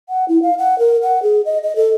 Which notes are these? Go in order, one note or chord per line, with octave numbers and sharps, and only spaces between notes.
F#5
E4
F5
F#5
A#4
F#5
G#4
D#5
D#5
A4